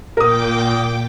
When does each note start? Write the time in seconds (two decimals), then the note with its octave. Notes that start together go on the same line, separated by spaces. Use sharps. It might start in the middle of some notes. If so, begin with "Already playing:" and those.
0.17 A#2 A#4 G5 D6 D#6